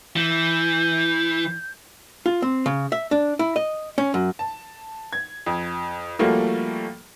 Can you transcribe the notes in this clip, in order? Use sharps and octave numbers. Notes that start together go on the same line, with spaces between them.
E3 G6
F4
C4
C#3
E5
D4
E4
D#5
C#4
F#2
A5
G#6
F2
F3 G3 A3 A#3 F#4